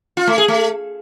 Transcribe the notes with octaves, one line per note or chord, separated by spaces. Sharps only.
F4
A3
G#4
A3